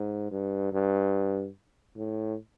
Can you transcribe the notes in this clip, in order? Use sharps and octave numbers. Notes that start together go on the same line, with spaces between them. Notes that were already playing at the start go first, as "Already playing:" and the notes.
Already playing: G#2
G2
G2
A2